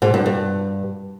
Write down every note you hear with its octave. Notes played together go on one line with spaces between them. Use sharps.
G#2
G2
G2